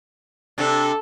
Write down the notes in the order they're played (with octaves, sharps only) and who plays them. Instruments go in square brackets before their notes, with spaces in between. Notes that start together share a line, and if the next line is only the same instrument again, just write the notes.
[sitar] C3 D4 [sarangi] A4